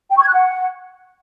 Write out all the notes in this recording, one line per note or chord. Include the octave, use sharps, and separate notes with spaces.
G5
C#6
G#6
F#6
F#5